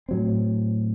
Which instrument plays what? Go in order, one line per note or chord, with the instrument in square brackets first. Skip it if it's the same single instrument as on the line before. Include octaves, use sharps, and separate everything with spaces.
[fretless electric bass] A2 F#3 C4